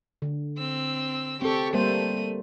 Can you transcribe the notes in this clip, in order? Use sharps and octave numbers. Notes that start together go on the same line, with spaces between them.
D3
C4 E6
C4 G4 A4 C#6
G3 A3 A#3 C5 D#7